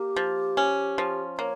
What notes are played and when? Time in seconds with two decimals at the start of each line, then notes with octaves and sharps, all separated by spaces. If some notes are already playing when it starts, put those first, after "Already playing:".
Already playing: A#3 G4
0.16 F3
0.57 C#4
0.98 F3
1.38 A#3 C#5